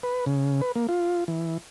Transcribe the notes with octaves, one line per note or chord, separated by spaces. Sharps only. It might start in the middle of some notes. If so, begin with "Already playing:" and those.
B4
C#3
B4
A#3
F4
E3